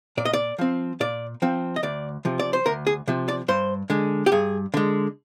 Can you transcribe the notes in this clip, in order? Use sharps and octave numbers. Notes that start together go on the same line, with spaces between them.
A#2 D5
D#5
D5
F3 C4
A#2 D5
F3 C4
D#5
D2 D5
C3 F3
D5
C5
D2 A#4
G#4
C3 F3
D5
G2 C5
D3 G#3
G4
G2 G#4
D3 G#3